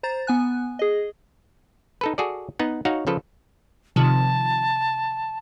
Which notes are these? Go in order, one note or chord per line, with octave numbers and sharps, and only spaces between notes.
C5 A#5 A6
B3 G#5 F#6
G#4 D#5
D#4 A4 B4
F#4 G#4 A4 D5
B3 D#4 F#5
D#4 F#4 C#5 F5 F#5
C#3 F3 A4 B4
C3 D#3 F3 A5